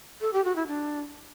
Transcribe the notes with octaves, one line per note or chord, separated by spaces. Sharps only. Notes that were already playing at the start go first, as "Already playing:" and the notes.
A4
G4
F#4
E4
D4